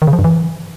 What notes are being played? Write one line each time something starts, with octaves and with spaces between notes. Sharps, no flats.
D#3
C#3
F3
G2
E3